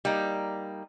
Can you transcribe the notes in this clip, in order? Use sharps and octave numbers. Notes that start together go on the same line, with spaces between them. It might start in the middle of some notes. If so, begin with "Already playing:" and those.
G3 A#3 D#4